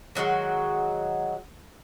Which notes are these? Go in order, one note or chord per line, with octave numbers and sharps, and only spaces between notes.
D#3 F#3 G#3 F#4